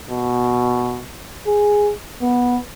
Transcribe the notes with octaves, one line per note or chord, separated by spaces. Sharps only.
B2
G#4
B3